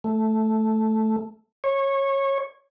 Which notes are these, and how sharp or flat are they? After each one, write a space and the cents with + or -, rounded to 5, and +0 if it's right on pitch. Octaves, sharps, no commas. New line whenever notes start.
A3 -5
C#5 -20